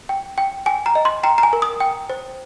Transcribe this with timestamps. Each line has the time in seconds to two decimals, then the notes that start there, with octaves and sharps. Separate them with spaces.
0.09 G5
0.38 G5
0.66 G5 G#5
0.86 A#5
0.95 D#5
1.05 C6
1.23 G5 A#5
1.38 A#5
1.43 G#5
1.53 A#4
1.62 D#6
1.80 G5
2.10 C5